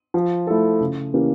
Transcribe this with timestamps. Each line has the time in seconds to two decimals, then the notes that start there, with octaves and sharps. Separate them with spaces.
0.14 F3
0.47 A3 E4 A4
0.81 C#3
1.14 E3 A#3 C#4 G4